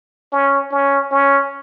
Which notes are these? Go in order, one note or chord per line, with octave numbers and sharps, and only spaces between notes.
C#4
C#4
C#4